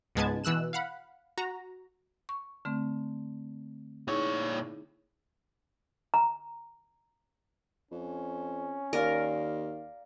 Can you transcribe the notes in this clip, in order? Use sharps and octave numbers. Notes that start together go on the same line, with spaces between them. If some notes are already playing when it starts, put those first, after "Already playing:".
C#2 G#2 G#3 B3 A5 G#6
B2 E3 E6 F#6 E7
F5 F#5 B5
F#4 A#5
C#6
D3 A3 C4
A#2 D#4 E4 G#4 C#5
A#5
F2 C#4
D#2 A#4 D5 F5